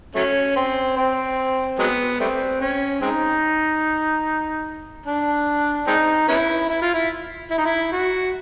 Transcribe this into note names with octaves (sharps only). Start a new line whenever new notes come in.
F#3 A3 C#4
C4
C4
F#3 G#3 B3
G3 A3 C4
C#4
G#3 C4 D#4
D4
G#3 C4 D#4
B3 C#4 E4
E4
F4
E4
E4
D#4
E4
F#4